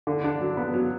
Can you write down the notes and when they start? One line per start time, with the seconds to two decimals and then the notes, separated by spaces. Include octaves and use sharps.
0.07 D3
0.24 D4
0.41 F#3
0.57 B3
0.74 F#3